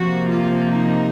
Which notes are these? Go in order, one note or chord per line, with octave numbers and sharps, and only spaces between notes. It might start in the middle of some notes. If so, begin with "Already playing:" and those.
Already playing: C3 F3 A#3 F#4
F4
D#4